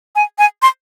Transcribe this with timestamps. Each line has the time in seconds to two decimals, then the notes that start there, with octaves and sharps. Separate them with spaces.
0.16 G#5
0.39 G#5
0.62 C6